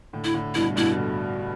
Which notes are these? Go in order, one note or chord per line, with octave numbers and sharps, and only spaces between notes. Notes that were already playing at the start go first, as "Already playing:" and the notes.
A2 D3
E4
A2 D3
G2 B2 E4
G2 B2 E4
A2 D3